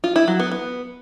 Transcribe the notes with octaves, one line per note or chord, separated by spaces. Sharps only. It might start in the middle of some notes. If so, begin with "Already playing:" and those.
F4
E4
F#3
B3
B3